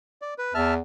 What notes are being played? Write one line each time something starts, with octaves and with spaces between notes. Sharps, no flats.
D5
B4
E2 E5 A5 F6